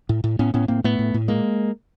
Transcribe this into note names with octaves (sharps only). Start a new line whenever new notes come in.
A2
A2
A2 B3 C#4
A2 B3 C#4
A2 A#3 C4
A2 A3 B3
A2
A2
A#2 G#3 A#3